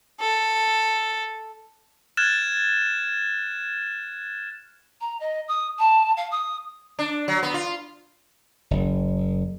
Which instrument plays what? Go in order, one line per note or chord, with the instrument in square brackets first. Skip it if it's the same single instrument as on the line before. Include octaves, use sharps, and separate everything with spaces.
[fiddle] A4
[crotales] F6 F#6 G#6 A6 E7
[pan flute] A#5
D#5
D#6
A5
F5
D#6
[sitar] D4
F#3
B3
F4
[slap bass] F#1